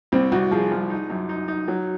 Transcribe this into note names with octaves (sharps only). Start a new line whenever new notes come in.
C2 C4
C2 F#4
F3 G#4
C2
D#4
F#2
D#4
D#4
F#3